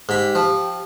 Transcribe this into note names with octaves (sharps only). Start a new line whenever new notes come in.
G#2 G4 B5
F3